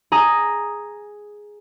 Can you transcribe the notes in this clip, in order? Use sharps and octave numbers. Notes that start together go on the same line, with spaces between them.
G#4 A#5 D#6